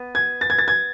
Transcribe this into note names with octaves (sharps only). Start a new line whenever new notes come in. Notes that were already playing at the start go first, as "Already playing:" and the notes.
Already playing: B3
G#6
A6
G#6
A6
G#6